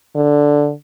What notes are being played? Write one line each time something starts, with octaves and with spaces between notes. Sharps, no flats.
D3